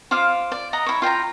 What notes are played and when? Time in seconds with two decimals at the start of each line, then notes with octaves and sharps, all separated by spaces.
0.11 F4 C5 F5 D6
0.52 D5
0.73 D#5 F#5 A#5
0.86 E4 C#5
1.02 F4 G5 A5 A#5